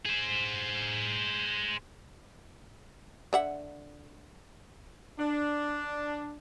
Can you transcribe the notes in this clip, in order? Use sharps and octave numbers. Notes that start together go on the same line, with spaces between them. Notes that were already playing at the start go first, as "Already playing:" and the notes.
G#4 C5
D3 E5 F#5
D4